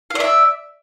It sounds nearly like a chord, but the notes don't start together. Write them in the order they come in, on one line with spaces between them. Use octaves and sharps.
F5 D5 E5